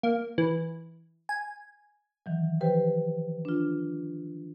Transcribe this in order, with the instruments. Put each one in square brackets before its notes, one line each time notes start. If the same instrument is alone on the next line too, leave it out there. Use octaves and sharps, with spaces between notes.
[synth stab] A#3
E3
G#5
[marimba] D#3 E3 F#3
F3 G4 B4 C5 G5
D4 F4